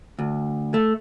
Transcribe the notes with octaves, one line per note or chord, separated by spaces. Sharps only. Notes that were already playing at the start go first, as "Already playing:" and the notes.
D2
A3